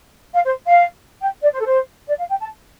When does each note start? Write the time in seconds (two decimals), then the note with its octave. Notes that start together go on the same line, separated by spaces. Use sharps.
0.34 F5
0.44 C5
0.67 F5
1.21 G5
1.42 D5
1.53 C5
1.59 A4
1.64 C5
2.08 D5
2.18 F5
2.30 G5
2.40 A5